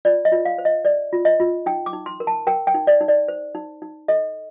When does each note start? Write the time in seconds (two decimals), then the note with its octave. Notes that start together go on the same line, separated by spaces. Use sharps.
0.05 F4 D5
0.25 D#5
0.32 F4
0.45 F5
0.58 C5
0.65 D#5
0.85 C5 D5
1.13 F4
1.25 D#5
1.40 F4
1.66 D#4 G5
1.86 D6
1.93 D#4
2.06 C6
2.20 A#4
2.27 A5
2.47 A#4 G5
2.67 G5
2.74 D#4
2.87 D5
3.01 D#4
3.08 D5
3.28 C5
3.55 D#4
3.82 D#4
4.08 A4 D#5